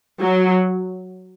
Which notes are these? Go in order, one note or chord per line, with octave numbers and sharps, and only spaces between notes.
F#3